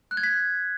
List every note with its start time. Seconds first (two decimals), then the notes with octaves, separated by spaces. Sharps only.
0.11 F#6
0.17 G#6
0.24 B6